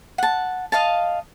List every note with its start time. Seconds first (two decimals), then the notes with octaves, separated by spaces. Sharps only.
0.18 F#5 A5
0.72 D#5 F5 A5